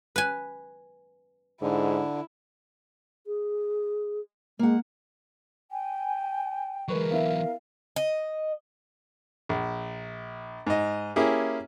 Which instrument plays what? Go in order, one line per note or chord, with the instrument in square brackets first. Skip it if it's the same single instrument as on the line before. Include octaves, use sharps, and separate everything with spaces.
[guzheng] B4 G#5
[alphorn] G#2 [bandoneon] D3 [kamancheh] E4
[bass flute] G#4
[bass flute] G#3 [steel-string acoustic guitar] A#3 F#5
[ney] G5 [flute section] G#5
[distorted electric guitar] E3 F#3 [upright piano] G#3 B4 C#6 [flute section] A#4
[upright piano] B3 E4 E5 [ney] F5
[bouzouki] D#5
[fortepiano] A#1
G#2 D#5
A#3 C#4 E4 G4 G#4